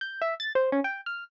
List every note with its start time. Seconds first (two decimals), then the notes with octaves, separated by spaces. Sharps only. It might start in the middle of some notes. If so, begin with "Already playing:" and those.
0.01 G6
0.22 E5
0.40 A6
0.55 C5
0.72 C#4
0.84 G5
1.06 F6